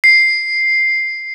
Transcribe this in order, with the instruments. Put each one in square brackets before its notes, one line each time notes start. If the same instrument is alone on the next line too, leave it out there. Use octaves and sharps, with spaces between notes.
[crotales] C7